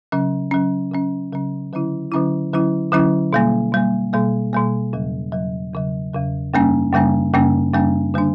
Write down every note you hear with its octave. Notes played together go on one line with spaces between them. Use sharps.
C#3 F#3 C#4
C#3 F#3 C#4
C#3 F#3 C#4
C#3 F#3 C#4
D3 F#3 C#4 E4
D3 F#3 C#4 E4
D3 F#3 C#4 E4
D3 F#3 C#4 E4
B2 G3 A#3
B2 G3 A#3
B2 G3 A#3
B2 G3 A#3
E2 C#3 F#3
E2 C#3 F#3
E2 C#3 F#3
E2 C#3 F#3
F#2 C#3 G3 A#3 C#4
F#2 C#3 G3 A#3 C#4
F#2 C#3 G3 A#3 C#4
F#2 C#3 G3 A#3 C#4
D3 G3 A#3 D4